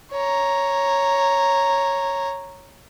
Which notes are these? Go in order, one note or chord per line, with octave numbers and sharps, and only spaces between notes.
C#5 A#5